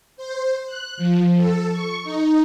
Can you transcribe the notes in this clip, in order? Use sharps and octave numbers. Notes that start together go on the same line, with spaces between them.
C5
F#6
F3
A4
C#6
D#4